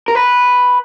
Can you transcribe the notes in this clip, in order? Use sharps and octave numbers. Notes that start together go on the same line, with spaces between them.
A#4
B4